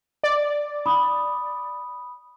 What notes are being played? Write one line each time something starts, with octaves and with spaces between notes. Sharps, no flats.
D5
B5 D#6